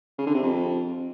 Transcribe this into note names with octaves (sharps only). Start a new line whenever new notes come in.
C#3
D3
C3
F2